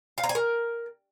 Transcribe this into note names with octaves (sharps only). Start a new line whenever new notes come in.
F5
A#5
G#5
A#4